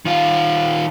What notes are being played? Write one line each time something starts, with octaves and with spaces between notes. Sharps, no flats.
D#3 F4